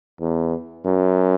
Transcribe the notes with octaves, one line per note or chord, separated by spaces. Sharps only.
E2
F#2